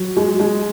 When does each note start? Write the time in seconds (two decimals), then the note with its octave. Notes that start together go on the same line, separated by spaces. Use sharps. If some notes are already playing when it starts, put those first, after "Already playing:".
Already playing: F#3
0.17 G#3
0.40 G#3